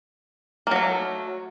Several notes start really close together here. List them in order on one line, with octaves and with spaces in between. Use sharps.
A#3 F#3 A3